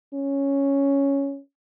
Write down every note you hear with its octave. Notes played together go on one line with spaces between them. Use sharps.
C#4